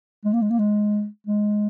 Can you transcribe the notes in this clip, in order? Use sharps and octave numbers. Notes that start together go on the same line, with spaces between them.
G#3
A#3
G#3
A#3
G#3
G#3